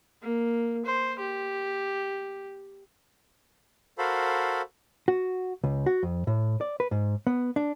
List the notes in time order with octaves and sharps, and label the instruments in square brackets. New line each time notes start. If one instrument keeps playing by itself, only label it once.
[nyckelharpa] A#3
C5
G4
[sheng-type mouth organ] F#4 A4 A#4 C5 F5 B5
[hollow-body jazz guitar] F#4
C#2
F#4
F2
A2
D5
B4
G#2
B3
D4